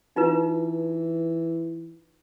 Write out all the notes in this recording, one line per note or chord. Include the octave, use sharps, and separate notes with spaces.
E3 D#4 F4 B4